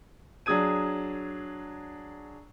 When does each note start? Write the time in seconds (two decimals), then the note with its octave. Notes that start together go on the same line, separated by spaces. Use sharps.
0.46 F#3 D4 G#4 D#6 G#6 D#7